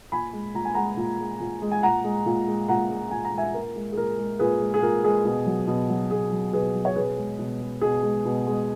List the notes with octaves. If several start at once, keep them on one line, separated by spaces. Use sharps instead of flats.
A#2 G#5 B5
G#3
A#2 A#5
G#5
G#3 F#5 A#5
A#2
G#3
A#2
G#3
G#5
A#2 F#5 A#5
G#3
A#2
G#3
A#2 F#5 A#5
G#3
A#2 G#5
A#5
G#3
E5 G#5
A#2 A#4
G#3
G#4
A#2 A#4
G#3
A#2 G#4 B4
G#3
G#4
A#2 A#4
G#3 G#4
B2
F#3
B2
F#3
B2 G#4
F#3
B2 G#4 B4
F#3
C#5
B2 G#4 B4
G#3
B2
G#3
B2 G#4
G#3
B2
G#3